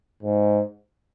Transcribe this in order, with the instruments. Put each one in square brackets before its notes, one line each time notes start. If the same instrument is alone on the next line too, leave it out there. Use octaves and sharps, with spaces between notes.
[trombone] G#2